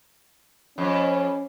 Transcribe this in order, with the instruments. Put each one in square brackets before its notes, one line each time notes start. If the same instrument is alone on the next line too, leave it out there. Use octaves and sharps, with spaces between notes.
[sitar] F2 [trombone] C#4